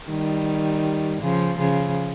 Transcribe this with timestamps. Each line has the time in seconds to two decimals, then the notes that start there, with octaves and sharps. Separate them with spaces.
0.09 D#3 G3
1.22 C#3 F3
1.58 C#3 F3